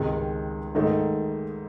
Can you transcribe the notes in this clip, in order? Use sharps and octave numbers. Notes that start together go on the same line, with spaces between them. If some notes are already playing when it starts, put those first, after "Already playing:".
Already playing: C#2 C3 D#3 G#3 D#4
G#2 D#3 A3 D#4